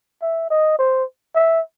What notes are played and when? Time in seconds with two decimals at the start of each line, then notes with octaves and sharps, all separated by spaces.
0.22 E5
0.50 D#5
0.79 C5
1.35 E5